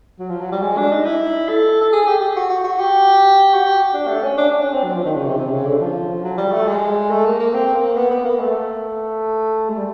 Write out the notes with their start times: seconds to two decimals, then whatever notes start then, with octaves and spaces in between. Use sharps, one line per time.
0.19 F#3
0.30 F3
0.40 F#3
0.52 G3
0.62 G#3
0.77 D4
0.91 D#4
1.05 E4
1.49 A4
1.81 A4
1.92 G#4
2.07 G4
2.21 G4
2.36 F#4
2.50 F#4
2.64 F#4
2.79 G4
3.54 F#4
3.65 G4
3.94 D4
4.07 A3
4.23 C#4
4.37 D4
4.51 D4
4.62 C#4
4.73 C4
4.84 F#3
4.95 F3
5.05 D#3
5.16 C#3
5.27 C3
5.38 C3
5.52 C#3
5.66 D3
5.81 F3
6.24 F#3
6.38 G3
6.52 A3
6.67 G#3
7.11 A3
7.25 A#3
7.40 A#3
7.54 C4
7.75 A#3
7.97 B3
8.11 B3
8.25 A#3
8.40 A3
9.69 G#3
9.76 G3